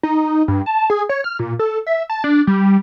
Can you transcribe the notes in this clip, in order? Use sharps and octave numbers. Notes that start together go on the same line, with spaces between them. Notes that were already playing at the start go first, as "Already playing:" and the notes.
D#4
G2
A5
G#4
C#5
F6
A#2
A4
E5
A5
D4
G3